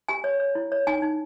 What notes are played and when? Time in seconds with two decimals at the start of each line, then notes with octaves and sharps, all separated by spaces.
0.08 G4 G#5
0.24 C#5
0.40 C#5
0.55 E4
0.72 C#5
0.87 D#4 G#5
1.02 D#4